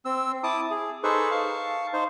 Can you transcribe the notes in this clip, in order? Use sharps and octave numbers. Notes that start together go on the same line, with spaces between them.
C4 E6
E4 A5 D6 D#6
G#4
D#4 G#4 A4 B4 C5 C#6
F5 A5 C#6
D#4 C5